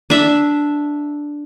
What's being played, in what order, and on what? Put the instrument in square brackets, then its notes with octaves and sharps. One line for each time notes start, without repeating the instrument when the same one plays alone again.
[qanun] D4 E5